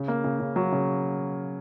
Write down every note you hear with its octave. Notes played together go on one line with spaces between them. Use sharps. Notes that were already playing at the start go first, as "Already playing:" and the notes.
Already playing: C#3
A#3
C#3
C#3
F#3
C#3